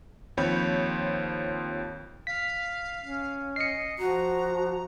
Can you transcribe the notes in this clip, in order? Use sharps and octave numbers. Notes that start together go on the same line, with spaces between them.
D#2 F3 C4 C#5 B5 G6
F5 B6
C#4
D#5 C7 C#7
F3 F#4 A#5